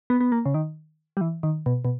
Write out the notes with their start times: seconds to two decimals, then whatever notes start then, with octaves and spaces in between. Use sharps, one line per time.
0.10 B3
0.21 B3
0.32 A#3
0.46 C#3
0.54 D#3
1.17 G3
1.21 E3
1.43 D#3
1.66 B2
1.85 B2